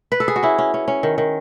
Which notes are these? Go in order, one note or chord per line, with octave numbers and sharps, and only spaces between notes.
B4
A4
G#4
F#4
C#4 E4
C#4
C#4
C#4
D#3
D#3